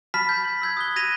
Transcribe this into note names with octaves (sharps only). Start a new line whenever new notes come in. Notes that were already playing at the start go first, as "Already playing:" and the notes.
A5 B5 F6 A6 B6
G6
F#7
E6 G6 G#6
D#6 F#6 G7
F#6 G#6 A#6 D#7 F7